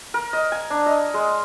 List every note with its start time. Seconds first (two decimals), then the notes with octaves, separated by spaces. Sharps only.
0.14 A#4
0.33 D#5
0.52 G#5
0.70 D4
0.86 D#5
1.14 G#3